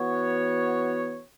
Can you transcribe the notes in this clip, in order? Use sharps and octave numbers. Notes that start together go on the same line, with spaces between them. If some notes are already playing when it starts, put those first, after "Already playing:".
Already playing: E3 B3 F#4 C#5